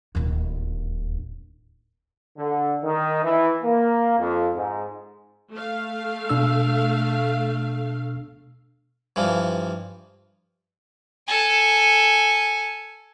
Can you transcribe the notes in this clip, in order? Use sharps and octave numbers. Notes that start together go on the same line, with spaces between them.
D1 D#2
D3
D#3
E3
A#3
F2
G#2
A3 F5
B2 D4 E6
G2 E3 F3
A4 G#5